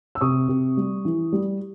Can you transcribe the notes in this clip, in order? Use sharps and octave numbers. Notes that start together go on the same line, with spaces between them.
E6
C3 C#6 D#6
C3
G3
E3
G3